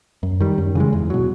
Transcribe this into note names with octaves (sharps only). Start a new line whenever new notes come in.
F#2
D#3 G3
F#2
C#3 E3 G#3
E2
B2 F#3